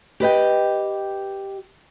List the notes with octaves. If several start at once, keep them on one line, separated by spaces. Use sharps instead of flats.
G4 B4 D#5 G5